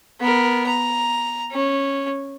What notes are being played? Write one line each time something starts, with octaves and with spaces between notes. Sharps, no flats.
B3 A#4
A#5
C#4